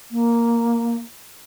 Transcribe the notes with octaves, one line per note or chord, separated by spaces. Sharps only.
A#3